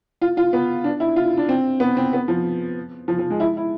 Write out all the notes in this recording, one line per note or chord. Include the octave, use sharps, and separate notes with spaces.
F4
F4
B3
D4
E4
F4
D4
C4
B3
C4
B3
F3
F3
F3
G#3
E4
E4